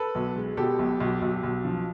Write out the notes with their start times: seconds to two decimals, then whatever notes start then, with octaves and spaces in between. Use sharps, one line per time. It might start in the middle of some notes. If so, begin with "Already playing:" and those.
Already playing: A4 B4
0.15 B1
0.36 G#3
0.57 B2 G4 A4
0.79 B1
1.00 B1
1.22 B1
1.43 B1
1.65 F3